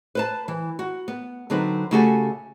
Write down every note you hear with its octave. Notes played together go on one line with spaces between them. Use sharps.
B4 C5 A5
E3
F#4
B3
D3 F#3 C4 D#4 B4
C#3 A3 F#4 G4 A4 G#5